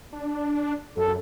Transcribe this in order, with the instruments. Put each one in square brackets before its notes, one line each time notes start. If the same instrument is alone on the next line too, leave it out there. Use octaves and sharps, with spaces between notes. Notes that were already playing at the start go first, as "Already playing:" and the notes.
[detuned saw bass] D4
[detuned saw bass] F#2 [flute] A4